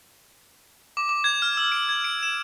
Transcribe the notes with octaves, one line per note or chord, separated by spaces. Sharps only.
D6
D6
G#6
F6
E6
D7
G#6
D7
E7